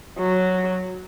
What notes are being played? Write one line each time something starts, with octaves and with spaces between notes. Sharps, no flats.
F#3